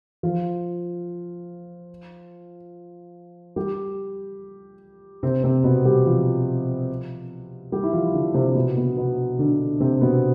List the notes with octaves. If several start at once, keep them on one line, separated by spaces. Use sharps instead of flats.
F3 F4
G3 G4
C3 C4
C3 C4
B2 B3
G3 G4
F3 F4
G3 G4
E4
F3 F4
D3 D4
C3 C4
B2 B3
B2 B3
B2 B3
D3 D4
C3 C4
B2 B3